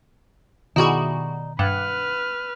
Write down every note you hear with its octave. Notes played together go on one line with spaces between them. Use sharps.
B2 D#3 G3 B3 D#4 E4 F#4 G#4
G2 B4 F#5 F6